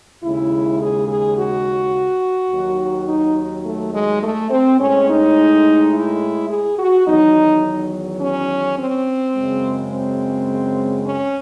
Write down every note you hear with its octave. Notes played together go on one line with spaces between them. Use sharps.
D#2 C#3 G#3 E4
G#4
G#4
F#4
D#2 D#3 F#3
D#4
A3
G#3
A3
C4
A2 G#3 C#4
D#4
E4
G#4
F#4
E2 D#3 F#3 D#4
C#4
C4
F#2 C#3 G#3
C4
C#4